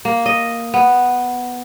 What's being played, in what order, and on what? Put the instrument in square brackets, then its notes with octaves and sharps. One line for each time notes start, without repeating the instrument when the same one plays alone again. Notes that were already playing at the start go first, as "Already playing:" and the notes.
[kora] A#3
D#5
B3